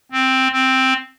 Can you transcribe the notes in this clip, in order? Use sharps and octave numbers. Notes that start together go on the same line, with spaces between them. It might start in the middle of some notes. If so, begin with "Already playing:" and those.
C4
C4